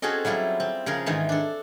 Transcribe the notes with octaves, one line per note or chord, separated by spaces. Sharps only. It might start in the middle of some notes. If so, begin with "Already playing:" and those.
C4 C#4 F#4 G#4 A4 D#5
F#3 G3 E4 F4
C4
C#3 F3 G#4 A#4
G#2 D#3 E3 G#3
D4 A4